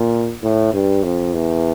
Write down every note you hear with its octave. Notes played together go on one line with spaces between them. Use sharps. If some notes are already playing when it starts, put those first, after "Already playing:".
Already playing: A#2
A2
G2
F2
E2